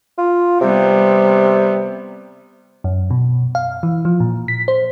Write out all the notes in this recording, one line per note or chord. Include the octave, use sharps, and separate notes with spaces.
F4
C3 G3 B3
F#2
B2
F5
E3
F3
A#2
B6
C5